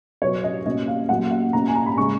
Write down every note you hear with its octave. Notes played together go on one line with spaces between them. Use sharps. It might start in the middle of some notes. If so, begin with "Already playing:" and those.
B2 F#3 B3 C#5
D#5
B2 A#3 C#4 D#5
F5
A#2 F#3 A#3 C#4 F#5
F#5
B2 A#3 C#4 A#5
G#5
A#5
B5
C#3 G#3 C#4 C#6